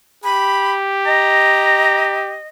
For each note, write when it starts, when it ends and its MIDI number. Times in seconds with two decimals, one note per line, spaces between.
0.24 2.39 67
0.24 0.74 83
1.06 2.47 75
1.06 2.16 82